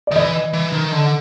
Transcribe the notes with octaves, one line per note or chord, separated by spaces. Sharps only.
D5
D#3
E3 D#5
E3
D#3
D3